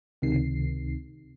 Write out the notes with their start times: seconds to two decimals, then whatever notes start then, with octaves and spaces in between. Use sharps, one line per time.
0.22 C#2 C3 D#3 C7